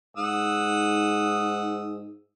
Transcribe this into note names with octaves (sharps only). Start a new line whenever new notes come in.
G#2 F#5 D#6 E6